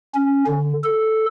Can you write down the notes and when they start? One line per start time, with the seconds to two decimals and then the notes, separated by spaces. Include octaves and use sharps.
0.15 C#4
0.47 D3
0.83 A4